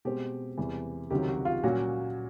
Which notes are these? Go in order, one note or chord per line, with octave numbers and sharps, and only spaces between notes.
B2 G#3 C4 G4
E2 C3 E3
C#2 C3 D#3 F#3 G4
F#4
F4
A#2 F#3 A#3 C#4 F#4